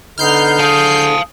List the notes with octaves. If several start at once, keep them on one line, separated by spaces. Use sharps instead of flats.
D3 B3 D#4 F6 G6 C7
G#4 F5 A5 D#6